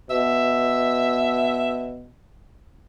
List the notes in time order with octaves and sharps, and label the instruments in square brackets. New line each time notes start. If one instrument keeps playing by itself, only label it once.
[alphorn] B2 [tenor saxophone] E5